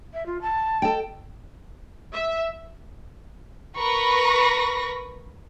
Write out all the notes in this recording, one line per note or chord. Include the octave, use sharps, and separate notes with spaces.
E5
F4
A5
A4 D#5 G5
E5
A#4 B4 B5 C#6 A#6